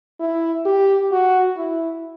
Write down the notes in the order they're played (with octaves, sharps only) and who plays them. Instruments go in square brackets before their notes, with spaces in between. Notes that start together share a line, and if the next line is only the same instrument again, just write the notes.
[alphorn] E4
G4
F#4
E4